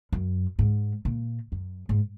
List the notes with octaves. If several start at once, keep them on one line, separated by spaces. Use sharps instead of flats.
F#2
G#2
A#2
F#2
G#2